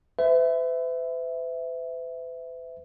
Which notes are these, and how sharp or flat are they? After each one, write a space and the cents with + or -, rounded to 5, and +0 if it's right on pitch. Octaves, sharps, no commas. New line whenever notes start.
B4 +45 E5 +0